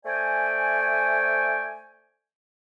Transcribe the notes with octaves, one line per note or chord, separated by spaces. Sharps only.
A3 C5 D5 G5 G#5